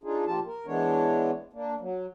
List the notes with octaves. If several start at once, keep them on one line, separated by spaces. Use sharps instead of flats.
D4 D#4 F4 G#4
A#2 F3 F4 G4 A5
A#4
E3 G#3 B3 D4 C#5
A#3 D4
F#3